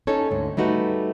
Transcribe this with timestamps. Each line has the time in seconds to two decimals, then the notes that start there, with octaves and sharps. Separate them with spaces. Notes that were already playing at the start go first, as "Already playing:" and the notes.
0.07 C#4 D#4 A4 C#5
0.31 D2 G#2
0.57 G3 A3 D#4 F#4 B4